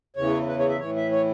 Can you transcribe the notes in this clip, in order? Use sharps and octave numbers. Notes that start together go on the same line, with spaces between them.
E2 C#3 E3 C#5
B4
C#5
E5
A2 E3 C#5
E5
C#5